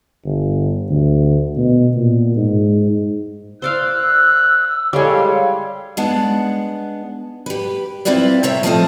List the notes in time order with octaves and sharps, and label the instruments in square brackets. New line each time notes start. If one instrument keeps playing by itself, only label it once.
[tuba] G1
D2
B2
A#2
G#2
[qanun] C5 D5 F5 [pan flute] E6 [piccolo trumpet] F#6
[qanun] G3 G#3 [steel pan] A4 C#5 D6 [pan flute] F5
[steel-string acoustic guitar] G#3 B3 D4 F#5
G4 B4
C4 E4 F4 B4 D5 E5
C3 C4 C#5 E5 G5
F3 A3 C4 F4 A4 D#5